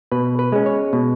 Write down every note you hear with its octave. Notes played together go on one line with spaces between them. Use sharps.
B2 B4
B4
G#3 C#4
C#5
B2